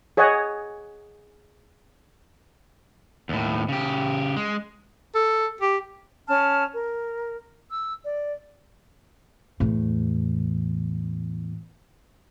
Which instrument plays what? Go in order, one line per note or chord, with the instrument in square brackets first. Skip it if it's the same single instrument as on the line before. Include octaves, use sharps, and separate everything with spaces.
[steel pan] G#4 C#5 D#5 F#5 G#5
[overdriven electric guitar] D#2 A2
C#3 G4
G#3
[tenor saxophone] A4
G4
[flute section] C#4 A5 F6
A#4
E6
D5
[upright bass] E2 A2